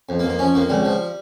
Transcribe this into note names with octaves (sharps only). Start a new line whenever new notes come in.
F2
A#3
F2
A#3
F3 C#4
F2 A#3
C#2 G3
F3